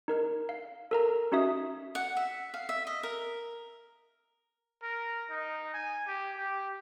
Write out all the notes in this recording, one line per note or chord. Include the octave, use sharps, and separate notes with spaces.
D#4 A#4 F6
F5
A4 A#4 A#5
C#4 D#4 F#4 E5 D#6
F#5
E5
F5
E5
D#5
A#4
A#4
D#4
G#5
G4
G4